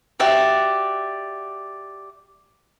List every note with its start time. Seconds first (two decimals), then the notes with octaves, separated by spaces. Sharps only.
0.20 F#4 G4 D5 E5